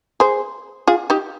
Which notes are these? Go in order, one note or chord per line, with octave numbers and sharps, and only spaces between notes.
G#4 C5
F4 G#4
D#4 G4